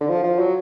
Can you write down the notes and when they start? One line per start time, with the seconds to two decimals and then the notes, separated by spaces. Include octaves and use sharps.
0.01 D3
0.09 F3
0.24 F3
0.39 F#3